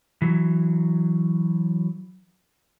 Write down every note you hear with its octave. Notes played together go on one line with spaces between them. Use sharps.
E3 F#3